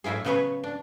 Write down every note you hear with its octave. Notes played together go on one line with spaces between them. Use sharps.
A2 F#3 E4 F4 G#4
C#3 F#3 B3 G#4 B4 C#5
D4